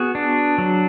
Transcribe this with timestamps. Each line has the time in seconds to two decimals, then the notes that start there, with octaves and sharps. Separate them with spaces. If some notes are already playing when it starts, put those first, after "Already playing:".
Already playing: B3 F#4 G#4
0.15 D4
0.58 F#3